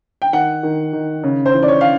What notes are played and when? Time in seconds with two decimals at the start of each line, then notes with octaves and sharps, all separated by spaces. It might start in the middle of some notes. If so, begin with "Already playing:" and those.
0.22 G5
0.33 D#3 F#5
0.63 D#3
0.93 D#3
1.24 C#3
1.46 C5
1.54 E3
1.63 D5
1.68 C#5
1.81 F5